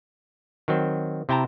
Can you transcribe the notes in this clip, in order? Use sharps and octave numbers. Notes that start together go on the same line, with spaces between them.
D#3 F#3 C4
C3 E4 G5 A5 A#5